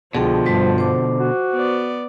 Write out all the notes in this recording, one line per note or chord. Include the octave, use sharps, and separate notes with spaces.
C2 B2 D3 F3 G#4 G5
G2 G3 C5
C5 D6
F#4
B3 D5